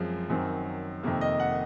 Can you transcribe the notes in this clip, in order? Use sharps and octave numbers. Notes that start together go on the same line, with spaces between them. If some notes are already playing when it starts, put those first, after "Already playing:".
Already playing: F#2 F3 G#3 C4
F#2 D#3 F#3 C4
F2 C3 D#3 A#3
D#5
F#5